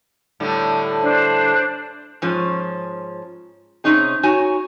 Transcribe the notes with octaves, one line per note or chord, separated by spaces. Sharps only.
A2 D3 G3
D4 C5
G#2 F3 C#4
C3 C#4 D#4 G#4
D#4 F#4 C#5 G#5